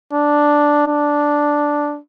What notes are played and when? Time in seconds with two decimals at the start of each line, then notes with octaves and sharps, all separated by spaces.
0.13 D4
0.87 D4